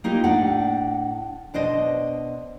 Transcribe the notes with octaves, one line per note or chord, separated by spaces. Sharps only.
A#3 D#4 F4 G4
A2 D4 F#5
B2 D4 C5 D#5